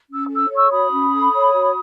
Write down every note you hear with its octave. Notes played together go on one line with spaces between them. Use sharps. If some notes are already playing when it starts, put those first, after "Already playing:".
C#4
E6
A4
E6
C#5
C#6 E6
F#4 B5 D#6
C#4
A4
C#5
F#4